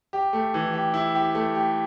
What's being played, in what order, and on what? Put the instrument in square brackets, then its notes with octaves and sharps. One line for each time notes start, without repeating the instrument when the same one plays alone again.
[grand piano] G4
A3
E3
G4
E4
G4
A3
G4